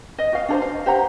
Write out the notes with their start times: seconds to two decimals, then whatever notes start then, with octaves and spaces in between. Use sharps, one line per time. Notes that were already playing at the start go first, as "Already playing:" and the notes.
0.19 D#5
0.33 F#4 F5
0.48 D4 A4 C5
0.62 F5
0.86 G4 C5 F#5 A#5